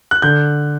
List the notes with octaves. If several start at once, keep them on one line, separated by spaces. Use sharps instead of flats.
F#6
D3 G6